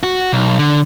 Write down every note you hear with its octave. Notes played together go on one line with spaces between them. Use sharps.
F#4
B1
D3